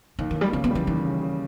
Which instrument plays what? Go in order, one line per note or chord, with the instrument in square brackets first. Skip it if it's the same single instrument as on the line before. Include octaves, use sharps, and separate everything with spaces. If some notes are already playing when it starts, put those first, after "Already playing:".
[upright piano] D#2 [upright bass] D#3
[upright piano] D#2 [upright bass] D#3
[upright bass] G3
[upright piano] C#3 [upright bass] B3
[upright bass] B3
[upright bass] E3 [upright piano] G3
[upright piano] D#2 [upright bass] E3
[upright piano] C#3
C#3